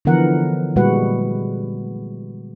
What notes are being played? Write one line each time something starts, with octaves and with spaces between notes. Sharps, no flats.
D3 E3 F3 B3 A#4 F#5
A#2 G3 G#3 F#4 B4 F#5